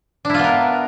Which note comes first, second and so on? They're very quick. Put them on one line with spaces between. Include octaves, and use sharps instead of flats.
D4 E4 F4 B3 A#4